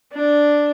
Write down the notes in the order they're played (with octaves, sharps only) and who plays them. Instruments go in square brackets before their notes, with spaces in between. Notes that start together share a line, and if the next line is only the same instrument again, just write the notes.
[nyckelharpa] D4